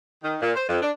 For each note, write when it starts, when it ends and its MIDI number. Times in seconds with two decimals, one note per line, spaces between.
0.24 0.36 51
0.41 0.52 46
0.55 0.63 72
0.68 0.79 41
0.81 0.90 62